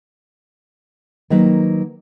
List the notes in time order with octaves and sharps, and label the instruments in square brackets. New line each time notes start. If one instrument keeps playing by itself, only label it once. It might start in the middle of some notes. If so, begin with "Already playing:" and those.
[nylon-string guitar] D#3 F#3 A#3 B4 C5